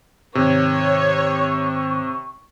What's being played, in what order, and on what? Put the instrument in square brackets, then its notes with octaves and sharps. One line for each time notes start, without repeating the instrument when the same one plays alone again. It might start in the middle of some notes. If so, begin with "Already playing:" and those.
[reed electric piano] G#2 D#3 [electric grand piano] C3 [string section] C#5 [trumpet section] C#6